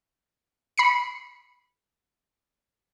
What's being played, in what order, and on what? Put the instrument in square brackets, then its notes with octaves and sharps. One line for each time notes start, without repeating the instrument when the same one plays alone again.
[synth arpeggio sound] B5 C7 C#7